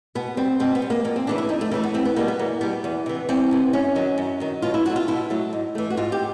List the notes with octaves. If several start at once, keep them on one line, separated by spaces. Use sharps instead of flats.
B2 B3
G3 C4
B2 C4
B3
G3
A#3
F2 A#3
C4
C#3 E3 A3 D4
E4
F2 D#4
A3
C#3 E3 A3 A#3
B3
E2 C4
B3
B2 G3 A#3
B3
E2 A#3
B2 G3 B3
E2
C3 E3
E2 C4
C3 E3
F#2 C#4
D#3 F#3
F#2
D#3 F#3
B2 F4
E4
F#3 A3 F#4
F4
B2 E4
F#3 A3
G#2
E3 A3
F#4
G#2 F4
G4